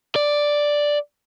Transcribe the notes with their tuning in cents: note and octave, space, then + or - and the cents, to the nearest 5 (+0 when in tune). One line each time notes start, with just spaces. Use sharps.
D5 +0